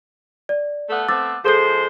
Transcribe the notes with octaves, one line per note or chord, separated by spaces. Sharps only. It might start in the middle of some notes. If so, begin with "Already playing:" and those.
D5
A3 B3 A4
A3 B3 C4 D6 E6 A6
F3 G#3 G#4 A4 C5 G6